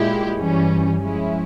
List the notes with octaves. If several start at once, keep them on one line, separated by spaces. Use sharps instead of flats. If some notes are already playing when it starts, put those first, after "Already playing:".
Already playing: A#2 G#3 E4 G4
G2 E3 G3 C#4
F3 G#3 C#4 E4